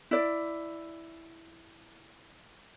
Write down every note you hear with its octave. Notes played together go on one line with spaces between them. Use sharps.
E4 D5